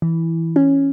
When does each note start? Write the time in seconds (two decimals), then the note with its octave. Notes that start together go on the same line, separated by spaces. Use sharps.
0.02 E3
0.56 C#4